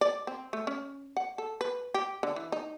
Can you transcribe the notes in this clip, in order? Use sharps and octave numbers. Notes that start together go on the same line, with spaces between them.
D5
C4
A3
C#4
F#5
A4
B4
G4
D3
E3
D#4